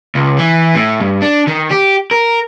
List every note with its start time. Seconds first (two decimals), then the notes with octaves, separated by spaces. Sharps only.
0.15 C#2
0.38 E3
0.75 A2
1.00 G2
1.22 D4
1.47 D#3
1.71 G4
2.11 A#4